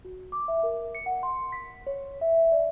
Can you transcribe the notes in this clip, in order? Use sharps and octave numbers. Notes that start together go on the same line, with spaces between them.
F#4
D6
E5
A#4
C#7
F#5
C6
B6
C#5
E5
E5
D5